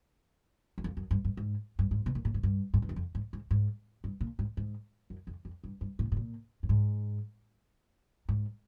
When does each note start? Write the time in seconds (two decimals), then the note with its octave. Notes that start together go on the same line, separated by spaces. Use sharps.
0.78 F#2
0.84 F2
0.97 F#2
1.11 G2
1.25 G2
1.37 G#2
1.79 G2
1.91 G#2
2.06 B2
2.15 A#2
2.25 A2
2.34 G#2
2.43 G2
2.74 G#2
2.82 G2
2.89 F#2
2.96 F2
3.15 G#2
3.33 G#2
3.51 G#2
4.04 G2
4.21 A#2
4.39 G#2
4.57 G#2
5.10 F#2
5.27 F2
5.45 F2
5.64 G2
5.81 G2
5.99 A2
6.12 A2
6.17 A#2
6.63 G2
6.69 G#2
8.29 G#2